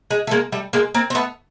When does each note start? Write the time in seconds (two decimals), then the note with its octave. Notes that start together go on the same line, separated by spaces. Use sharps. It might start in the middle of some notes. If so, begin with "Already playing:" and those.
0.11 G#3
0.27 A3
0.31 G#3 A#3
0.52 G3 A3
0.73 G#3 A#3
0.94 A#3 C4
1.10 C4
1.15 A3 B3